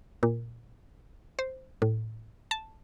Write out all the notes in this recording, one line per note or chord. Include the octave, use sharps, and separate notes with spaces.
A#2
C5
A2
A5